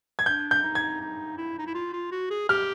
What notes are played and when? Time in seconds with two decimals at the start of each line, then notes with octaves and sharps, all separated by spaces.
0.19 G#6
0.26 D4 G6
0.51 G6
0.63 D#4
0.75 G#6
1.01 D#4
1.37 E4
1.59 D#4
1.66 E4
1.75 F4
1.93 F4
2.12 F#4
2.31 G#4
2.49 G4 F6